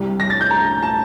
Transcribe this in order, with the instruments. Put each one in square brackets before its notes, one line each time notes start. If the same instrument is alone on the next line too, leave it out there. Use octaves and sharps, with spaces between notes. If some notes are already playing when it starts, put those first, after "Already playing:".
Already playing: [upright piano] C2 C3 G3
A#6
A6
G6
A#5
A5